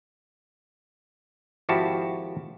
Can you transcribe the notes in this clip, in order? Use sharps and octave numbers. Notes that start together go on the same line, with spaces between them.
G#1 F3 E4 F#4 G4 A5